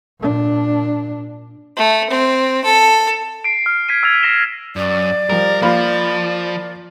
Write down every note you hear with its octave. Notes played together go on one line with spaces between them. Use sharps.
A#2 D4
A3
C4
A4
C7 D7
F6
G#6 B6 C7 D#7
E6 F6 G#6 A6 F7
E6 A#6 C7 E7 G7
F#2 D5
F3 G3 A#4
F3 A#3 F4 B5